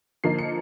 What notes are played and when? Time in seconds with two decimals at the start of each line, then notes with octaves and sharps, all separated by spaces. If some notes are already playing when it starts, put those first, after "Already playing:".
0.24 D3 F3 A#3 D#4 C7
0.39 C#7